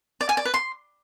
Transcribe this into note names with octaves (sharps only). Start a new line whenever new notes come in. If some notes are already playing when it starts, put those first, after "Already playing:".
D5
G#5
D5
B4
C6